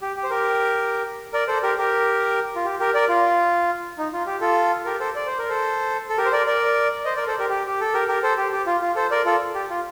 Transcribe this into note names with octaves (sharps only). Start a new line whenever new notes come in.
G4
G4
C5
G4 A#4
A#4 D5
A4 C5
G4 A#4
G4 A#4
F4
G4
G4 A#4
A#4 D5
F4
D#4
F4
G4
F4 A4
G4 A#4
A4 C5
D5
C5
A#4
A4 C5
A4
G4 A#4
C5
A#4 D5
A#4 D5
C5 D#5
A#4 D5
A4 C5
G4 A#4
G4
G4
A4
G4 A#4
G4 A#4
A4 C5
G4
G4
F4
F4
A4 C5
A#4 D5
F4 A4
G4
F4